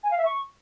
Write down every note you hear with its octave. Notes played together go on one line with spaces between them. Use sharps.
G#5
F5
E5
C#6